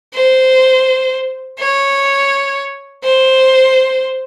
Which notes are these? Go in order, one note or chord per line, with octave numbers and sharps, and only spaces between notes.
C5
C#5
C5